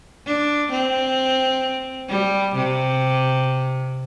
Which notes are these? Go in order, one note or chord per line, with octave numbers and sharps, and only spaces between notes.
D4
C4
G3
C3